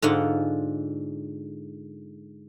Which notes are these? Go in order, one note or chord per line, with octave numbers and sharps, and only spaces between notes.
G#2 D3 F4 F#5